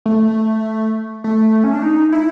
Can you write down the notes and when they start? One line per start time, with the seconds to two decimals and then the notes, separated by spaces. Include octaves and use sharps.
0.06 A3
1.24 A3
1.64 C#4
1.73 D4
1.83 D#4
2.12 E4